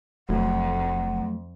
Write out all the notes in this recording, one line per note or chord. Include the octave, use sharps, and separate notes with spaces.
E1 F2 F#3 A3 F#5